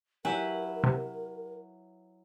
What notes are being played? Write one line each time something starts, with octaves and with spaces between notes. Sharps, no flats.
F#3 E4 G4 A#4 B4 C#5 G#5
C3